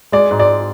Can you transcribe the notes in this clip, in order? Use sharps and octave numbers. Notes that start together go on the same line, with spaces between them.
G#3 D5
G#2
D5